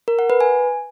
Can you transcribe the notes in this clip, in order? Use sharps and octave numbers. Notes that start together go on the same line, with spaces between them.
A#4
F#5
B4
G#5